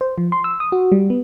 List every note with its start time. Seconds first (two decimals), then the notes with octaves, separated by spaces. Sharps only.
0.01 C5
0.18 F3
0.32 C6
0.44 E6
0.60 D#6
0.72 F#4
0.92 G3
1.10 B3